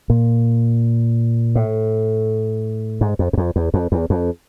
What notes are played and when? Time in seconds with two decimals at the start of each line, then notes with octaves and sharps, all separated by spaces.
0.10 A#2
1.55 A2
3.01 G#2
3.19 F2
3.33 F#2
3.37 F2
3.56 E2
3.74 F2
3.92 E2
4.10 F2